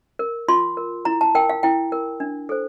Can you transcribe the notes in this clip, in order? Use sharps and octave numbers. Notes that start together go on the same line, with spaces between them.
A#4
F4 C6
A#4
E4 A#5
A5
A#4 G5
F5
E4 G5
A#4
D4
A4 C5